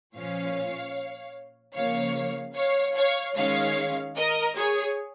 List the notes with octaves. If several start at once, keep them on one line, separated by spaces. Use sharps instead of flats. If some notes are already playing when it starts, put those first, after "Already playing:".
A#2 F3 C#4 C#5 F5
C#3 F3 A#3 C#5 F5
C#5 F5
C#5 F5
D#3 G#3 C#4 C#5 F5
A#4 D#5
G#4 C#5